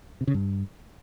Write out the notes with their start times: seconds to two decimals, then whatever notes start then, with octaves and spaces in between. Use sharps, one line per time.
0.21 C3
0.27 C#3
0.34 G2